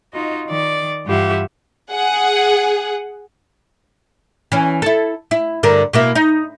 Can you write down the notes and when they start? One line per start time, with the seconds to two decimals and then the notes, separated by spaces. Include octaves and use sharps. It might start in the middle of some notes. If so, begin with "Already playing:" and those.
0.13 D#4 F4 F#4 D#5
0.47 D#3 D5
1.06 G2 E3 F4 G4 E5 F#5
1.92 G#4 F#5
4.52 E3 C#4
4.82 E4 A4
5.31 E4
5.63 G2 D3 A#4
5.93 B2 A#3 E4
6.15 D#4